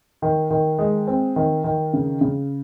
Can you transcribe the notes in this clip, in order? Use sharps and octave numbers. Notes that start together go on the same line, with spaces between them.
D#3
D#3
G#3
C4
D#3
D#3
C#3
C#3